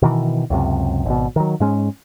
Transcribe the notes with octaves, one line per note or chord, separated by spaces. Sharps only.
B2 D#3 E3
C#2 F#2 C3
G#1 B2
D#3 F#3
G#2 G#3 C#4